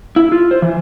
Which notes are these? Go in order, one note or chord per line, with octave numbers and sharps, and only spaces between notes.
E4
F4
C5
E3